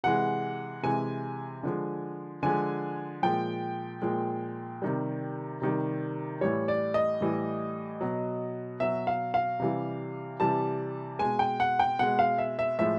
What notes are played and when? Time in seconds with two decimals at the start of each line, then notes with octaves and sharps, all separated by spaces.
0.04 C3 E3 G#3 F#5
0.83 C3 E3 G#3 G#5
1.63 D3 F3 G#3
2.43 D3 F3 G#3 G#5
3.22 A#2 F3 G#3 G5
4.02 A#2 F3 G#3
4.82 C3 D#3 G3
5.62 C3 D#3 G3
6.41 A2 E3 G3 C#5
6.68 D5
6.94 D#5
7.21 A2 E3 G3
8.01 B2 F#3
8.80 B2 F#3 E5
9.07 F5
9.34 F5
9.60 C3 E3 G3
10.40 C3 E3 G3 A5
11.19 B2 G#3 G#5
11.39 G5
11.60 F#5
11.79 G5
11.99 B2 G#3 F#5
12.19 F5
12.38 E5
12.59 E5
12.79 A2 F3 G#3 E5